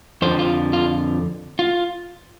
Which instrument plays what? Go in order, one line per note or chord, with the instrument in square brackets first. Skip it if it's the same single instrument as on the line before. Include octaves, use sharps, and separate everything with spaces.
[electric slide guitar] F2 D3 F3 C5
F4
F4
F4